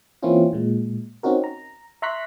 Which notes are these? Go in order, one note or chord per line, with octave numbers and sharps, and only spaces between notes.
E3 A#3 C4 C#4 E4 F4
A#2 G#3
C4 C#4 D#4 F#4 A#4
A#5
E5 A#5 C6 C#6 F#6 B6